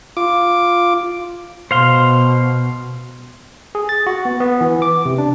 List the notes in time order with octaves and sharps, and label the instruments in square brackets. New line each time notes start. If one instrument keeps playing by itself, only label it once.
[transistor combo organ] F4 D6
[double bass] B2 [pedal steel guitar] C5 F5 C6
[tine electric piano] G#4
A6
F#4
B3
B3
E3
D6
C3
D4